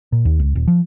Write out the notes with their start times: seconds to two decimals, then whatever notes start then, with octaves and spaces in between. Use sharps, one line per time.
0.12 A#2
0.25 D#2
0.39 C#2
0.55 D#1
0.67 F3